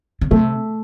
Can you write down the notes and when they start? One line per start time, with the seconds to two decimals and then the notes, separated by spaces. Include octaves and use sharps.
0.21 C#3
0.31 C3 A3